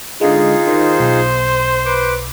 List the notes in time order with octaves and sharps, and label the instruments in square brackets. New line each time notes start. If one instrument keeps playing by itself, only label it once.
[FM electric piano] D3 G#3 [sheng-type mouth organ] D#4 F4 G#4
[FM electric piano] D#3 [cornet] C5
[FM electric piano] B1
[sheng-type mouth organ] B4 D6